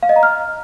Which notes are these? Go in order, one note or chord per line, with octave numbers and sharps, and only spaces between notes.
F5
D#5
A#5
F6